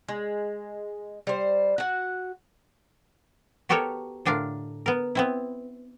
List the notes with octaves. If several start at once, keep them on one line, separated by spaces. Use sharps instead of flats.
G#3
G3 C5
F#4 F#5
B3 F#4 G4 A4 A#4 C#5
A2 D3 D4 F4 A#4
B3 A#4
B3 C4 E4